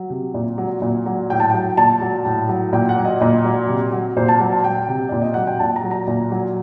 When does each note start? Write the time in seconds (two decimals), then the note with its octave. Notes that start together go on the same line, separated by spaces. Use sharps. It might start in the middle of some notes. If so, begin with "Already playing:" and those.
Already playing: F#3
0.10 C3
0.34 A#2
0.58 F#3
0.82 A#2
1.06 F#3
1.30 A2 G5
1.40 A5
1.50 F#3 G5
1.77 A#2 A5
2.01 F#3
2.25 A2
2.49 F#3
2.73 A#2 G5
2.89 F#5
2.97 F#3
3.05 D#5
3.21 A#2 D#5
3.45 F#3
3.68 C3
3.92 F#3
4.17 A#2 C5
4.28 A5
4.40 F#3
4.52 A5
4.64 F#3 G5
4.88 C3
5.09 A#2 D5
5.22 D#5
5.34 F#3 F#5
5.47 G5
5.59 A#2 A5
5.76 A#5
5.84 F#3
5.91 A#5
6.08 A#2
6.32 F#3